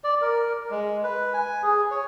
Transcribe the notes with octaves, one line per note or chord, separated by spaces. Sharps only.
D5
A#4
G#3
B4
G#5
G#4
C#5